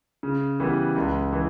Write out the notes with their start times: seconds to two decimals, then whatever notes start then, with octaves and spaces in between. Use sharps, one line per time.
0.23 C#3
0.60 E3 G3 B3
0.96 C#2
1.33 E3